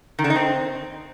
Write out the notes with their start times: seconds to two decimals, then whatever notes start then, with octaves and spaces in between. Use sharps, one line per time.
0.19 D#3
0.24 D3
0.30 D#4
0.36 C4